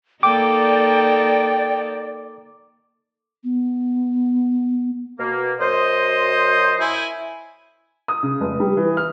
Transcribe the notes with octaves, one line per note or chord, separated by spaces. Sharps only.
A#3 D#4 A4 D5 G5 D6
B3
B2 A#3
F#2 F#3 C5 D#5
E4 G#5
D#6
C#3
F1
G3
E3
F6